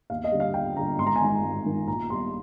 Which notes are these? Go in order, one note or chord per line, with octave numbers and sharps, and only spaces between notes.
D#2 F5
D#5
D3 G3
F5
D#2 G5
D3 G3 A#5
G#1 C6
A#5
G#5
G#2 D#3 A#5
G#1
G#2 D#3
A#1 A#5
A#2 G3 C6